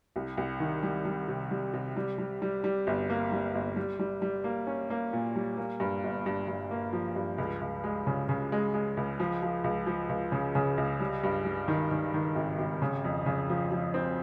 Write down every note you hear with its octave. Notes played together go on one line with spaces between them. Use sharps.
C2
C2
D#3
G3
G3
C3
G3
C3
G3
G3
G3
G3
G1
A#3
G3
G1
G3
G3
G3
A#3
C#4
A#3
A#2
G3
A#3
G2
G1
G2
G2
A#3
F3
G2
C#2
C#2
G#3
C#3
C#3
G#3
G#3
C#2
F3
F3
C#2
F3
C#2
C#3
C#3
C#2
G3
G2
G3
D#3
D#3
D#3
G#1
G#1
C#3
F2
C#3
F3
F3
C4